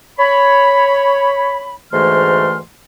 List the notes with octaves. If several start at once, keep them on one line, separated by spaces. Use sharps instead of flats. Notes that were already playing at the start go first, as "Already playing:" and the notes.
C#5 B5
D2 G#2 E3 A3 C6 F6